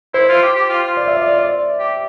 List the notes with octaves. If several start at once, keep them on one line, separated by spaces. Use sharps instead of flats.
E4 C5
F4
G4
G4
F4
F4
D5
E5
D5
D5
D5
G4